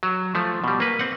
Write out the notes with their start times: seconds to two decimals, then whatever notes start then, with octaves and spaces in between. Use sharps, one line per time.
0.03 F#3
0.35 F3 A3
0.64 B2 G3
0.80 A#3 B4
0.99 C4 F#5